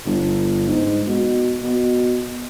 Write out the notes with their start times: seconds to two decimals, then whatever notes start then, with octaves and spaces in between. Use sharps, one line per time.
0.05 G1
0.68 G#2
1.07 B2
1.63 B2